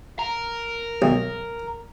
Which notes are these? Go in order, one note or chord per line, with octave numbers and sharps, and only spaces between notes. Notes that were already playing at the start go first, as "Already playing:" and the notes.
A#4
B1